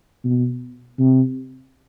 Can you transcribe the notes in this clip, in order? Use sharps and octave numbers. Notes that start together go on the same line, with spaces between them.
B2
C3